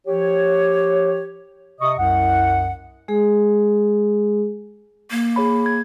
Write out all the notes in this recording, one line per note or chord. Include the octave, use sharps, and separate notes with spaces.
F3 G4 C#5
C3 D#5 C#6 D#6
C2 F#2 F#5
G#3 G#4
A#3
G#4 C#5 B5
G#6